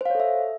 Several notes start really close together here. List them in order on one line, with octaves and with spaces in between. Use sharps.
C5 F5 C#5 A4 E5